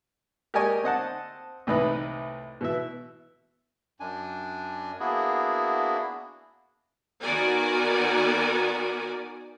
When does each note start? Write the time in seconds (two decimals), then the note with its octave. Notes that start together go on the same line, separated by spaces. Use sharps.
0.54 G4 A#4 D5 D#5 G#5 C#6
0.84 C4 D#5 F#5 A5
1.67 C2 A2 E3 D#4 B4 D#5
2.61 B2 E3 E5
4.00 F#2 D4 G#5
5.00 A#3 B3 D4 E4 F#4 G#4
7.22 D#3 B3 F#4 A#4 D5 G#5